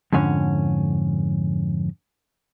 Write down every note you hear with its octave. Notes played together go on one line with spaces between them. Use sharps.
F2 G#2 D3 C#4